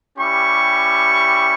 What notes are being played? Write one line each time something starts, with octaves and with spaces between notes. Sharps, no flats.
G3 C#4 E4 G4 C#6